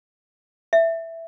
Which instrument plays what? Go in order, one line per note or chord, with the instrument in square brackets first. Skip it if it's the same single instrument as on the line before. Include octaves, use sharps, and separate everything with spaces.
[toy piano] E5